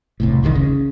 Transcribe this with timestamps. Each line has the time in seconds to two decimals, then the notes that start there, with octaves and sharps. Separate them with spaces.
0.20 E1 C2 A2
0.43 F#1 C2 A2 D#3
0.55 C#3